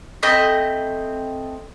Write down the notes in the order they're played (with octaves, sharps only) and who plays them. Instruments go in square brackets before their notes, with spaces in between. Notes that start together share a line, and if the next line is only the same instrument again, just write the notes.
[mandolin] A3 C4 D#5 B5